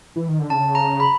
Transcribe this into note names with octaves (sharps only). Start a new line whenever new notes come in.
E3
D#3
D3
C#3 A5
A#5
B5